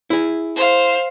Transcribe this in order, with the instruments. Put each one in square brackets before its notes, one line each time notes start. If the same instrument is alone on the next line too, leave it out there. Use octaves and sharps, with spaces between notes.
[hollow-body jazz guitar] E4 G#4
[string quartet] C5 F5